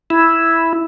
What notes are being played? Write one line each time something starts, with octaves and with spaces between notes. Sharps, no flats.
E4